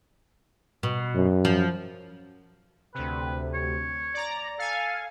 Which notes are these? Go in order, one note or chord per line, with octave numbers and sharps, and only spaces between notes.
B2
F#2
F3
D2 C3 B4
C#5
D5 A#5
A4 F5 G#5